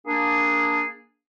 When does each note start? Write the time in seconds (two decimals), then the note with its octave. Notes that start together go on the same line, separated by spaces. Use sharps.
0.06 A#3 D4 G#4